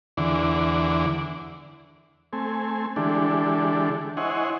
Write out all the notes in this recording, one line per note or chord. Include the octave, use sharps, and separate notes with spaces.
E2 D3
A3 C4 G#5
D3 E3 G#3 D4 G4 A4
E4 C5 C#5 D#5 F#5 G#5